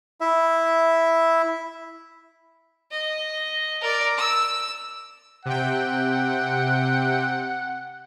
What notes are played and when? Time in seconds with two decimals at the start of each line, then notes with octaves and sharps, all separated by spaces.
0.21 E4 E5
2.91 D#5
3.81 A#4 D5
4.18 E6
5.45 C3 F#5 G5